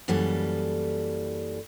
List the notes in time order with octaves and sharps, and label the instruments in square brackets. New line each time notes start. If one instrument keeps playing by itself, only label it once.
[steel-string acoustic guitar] F#2 E3 G3 A#3 A4